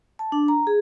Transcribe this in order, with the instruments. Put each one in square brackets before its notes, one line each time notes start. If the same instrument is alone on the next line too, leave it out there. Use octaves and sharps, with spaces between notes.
[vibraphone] A5
D4
A#5
G#4